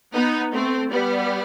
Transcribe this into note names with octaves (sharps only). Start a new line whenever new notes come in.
B3 D#4
A3 C4
G3 B3